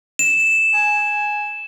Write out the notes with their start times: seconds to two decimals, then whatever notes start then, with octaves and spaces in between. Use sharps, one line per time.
0.19 E7
0.74 G#5